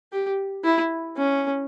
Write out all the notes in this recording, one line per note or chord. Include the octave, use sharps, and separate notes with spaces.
G4
E4
C#4